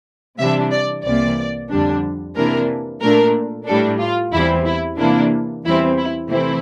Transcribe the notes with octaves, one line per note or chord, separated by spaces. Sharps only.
C3 E3 G3 D4 E5
D5
C2 C3 E3 A#3 D5
F2 D3 G3 D4
C3 E3 A#3 D4 A#4
A#2 A3 D4 A#4
A2 G3 D4 A4
F4
E2 E3 G3 C4 E4
E4
C3 E3 A#3 D4 E4
E2 E3 G3 C4 E4
E4
C3 E3 A3 C4 E4